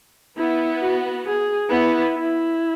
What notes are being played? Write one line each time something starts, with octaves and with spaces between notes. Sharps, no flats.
B3 E4
F#4
G#4
B3 E4
E4